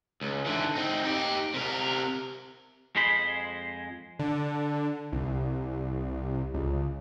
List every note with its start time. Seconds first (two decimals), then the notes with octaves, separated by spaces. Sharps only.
0.21 C#2
0.46 D3 E3
0.75 C4 D#4
1.05 D#4 G4
1.54 C3 A#4
2.96 F2 G#3 G#4 C5 B5
4.19 D3
5.12 C2
6.54 C#2